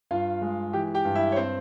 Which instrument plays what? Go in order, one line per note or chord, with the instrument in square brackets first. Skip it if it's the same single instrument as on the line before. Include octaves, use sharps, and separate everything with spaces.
[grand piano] G2 F4 F5
G#3
E3 G4 G5
G4 G5
G2
E4 E5
C#5
C4 C5